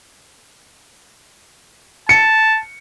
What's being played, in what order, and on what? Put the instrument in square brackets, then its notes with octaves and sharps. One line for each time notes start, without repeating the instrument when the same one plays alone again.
[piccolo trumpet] A5 [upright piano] C#7